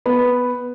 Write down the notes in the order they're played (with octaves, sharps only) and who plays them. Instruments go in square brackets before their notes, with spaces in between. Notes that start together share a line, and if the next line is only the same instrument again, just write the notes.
[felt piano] B3